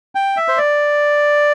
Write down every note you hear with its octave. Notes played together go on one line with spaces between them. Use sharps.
G5
E5
C5
D5